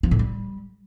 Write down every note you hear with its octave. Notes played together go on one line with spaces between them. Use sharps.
F3
A2
G3